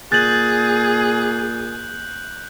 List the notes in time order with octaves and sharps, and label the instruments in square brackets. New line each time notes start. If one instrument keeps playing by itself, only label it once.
[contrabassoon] A#2 [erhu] G#4 [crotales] F#6 G6 F#7 [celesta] A6